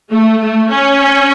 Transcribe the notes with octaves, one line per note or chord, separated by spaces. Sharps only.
A3
A3
C#4